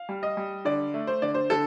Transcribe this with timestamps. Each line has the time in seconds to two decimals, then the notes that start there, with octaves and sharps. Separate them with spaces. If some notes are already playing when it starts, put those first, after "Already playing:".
Already playing: F5
0.09 G3
0.23 D#5
0.37 G3
0.65 D3 D5
0.94 A3
1.07 C5
1.22 D3 D5
1.35 C5
1.50 D3 A4